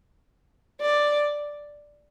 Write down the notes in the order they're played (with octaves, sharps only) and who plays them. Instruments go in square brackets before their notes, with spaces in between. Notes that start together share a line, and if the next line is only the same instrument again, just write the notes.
[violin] D5